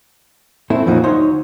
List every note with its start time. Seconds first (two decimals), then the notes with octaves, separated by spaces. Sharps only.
0.70 A3 C4 E4
0.86 F2 A#2 F3 F#3 D#4
1.03 D2 D#4 C5 C#5 F#5 C6